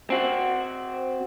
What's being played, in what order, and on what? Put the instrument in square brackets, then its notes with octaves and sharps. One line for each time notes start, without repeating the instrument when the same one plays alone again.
[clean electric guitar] C4 F#4